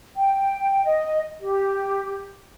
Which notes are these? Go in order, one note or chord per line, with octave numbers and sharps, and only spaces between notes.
G5
D#5
G4